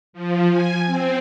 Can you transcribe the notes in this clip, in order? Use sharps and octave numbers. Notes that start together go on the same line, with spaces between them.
F3
G#5
C4